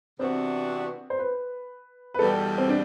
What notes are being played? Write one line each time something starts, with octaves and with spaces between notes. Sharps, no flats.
C3 E3 B3 C4 D4 F#4
C5
B4
B4
E2 B2 G3 A4
C4
D4